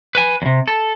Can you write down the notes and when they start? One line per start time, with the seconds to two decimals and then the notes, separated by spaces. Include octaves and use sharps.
0.15 B4 G#5
0.42 E2 C3
0.68 A4